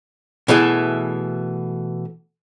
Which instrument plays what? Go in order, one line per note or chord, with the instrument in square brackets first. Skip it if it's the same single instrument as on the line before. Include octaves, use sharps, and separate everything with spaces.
[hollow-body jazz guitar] B2 E3 A3 G#4